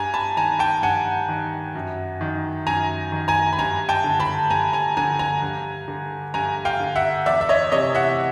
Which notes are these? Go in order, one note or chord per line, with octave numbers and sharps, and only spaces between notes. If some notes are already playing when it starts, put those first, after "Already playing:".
Already playing: G2 G#5 A#5
A5 B5
D#3 G#5 A#5
G5 A5
G2 F#5 G#5
D#3
F#2
D#3
F#2 G#5 A#5
D#3
G#5 A#5
B5
G2 G#5 A#5
G5 A5
D3
A5 B5
G2 G#5 A#5
G#5 A#5
D3 G#5 A#5
G#5 A#5
G2
D3
G2 G#5 A#5
F5 G5
D3
E5 F#5
E2 D5 E5
E5
C#5 D#5
C3 E3 C#5 D#5
E5 F#5